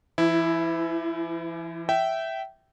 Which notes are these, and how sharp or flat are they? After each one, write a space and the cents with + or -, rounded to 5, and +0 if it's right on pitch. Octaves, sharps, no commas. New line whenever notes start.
E3 +40 E4 +0
E5 +0 G5 -20